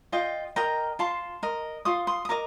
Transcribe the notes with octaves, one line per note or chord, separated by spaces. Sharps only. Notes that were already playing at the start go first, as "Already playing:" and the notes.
F4 D#5 G5
A#4 D#5 G5 A#5
F4 A5 C6
A#4 D#5
F4 C6 D#6
C6 D#6
D#6
A#4 D#5 A#5 D6